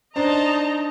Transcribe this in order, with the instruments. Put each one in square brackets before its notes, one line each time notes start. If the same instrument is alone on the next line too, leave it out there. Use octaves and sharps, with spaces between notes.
[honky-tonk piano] D4 C5 [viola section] D#4 D#5 A#5 [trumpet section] A5